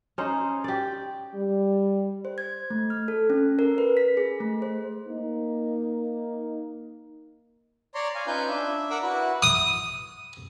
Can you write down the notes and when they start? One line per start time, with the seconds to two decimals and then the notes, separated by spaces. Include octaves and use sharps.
0.18 C#4 D#4 C5
0.64 G4 D5
1.35 G3
2.25 C5
2.38 G#6
2.70 A3
2.90 F6
3.08 A4
3.30 C#4
3.59 A#4
3.78 B4
3.97 B6
4.17 G#4
4.40 A3
4.62 C5
5.06 A#3 D#4
7.95 C#5 D5 A#5 C6
8.15 F5 G#5
8.27 C#4 D#4 F4 B4 G#5 G6
8.48 D4 E5
8.90 A#4 F#5 D6 E6
9.02 E4 F#4 B4
9.43 D#6